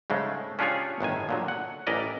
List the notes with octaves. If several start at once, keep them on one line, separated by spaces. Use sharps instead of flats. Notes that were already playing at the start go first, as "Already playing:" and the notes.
G#2 C#3 G#3 A3
C#4 D4 F4 G4 G#4 C#5
G1 A2 D#3 G#5
A#2 D3 F#3
F#5
A1 E3 E4 A#4 D5 D#5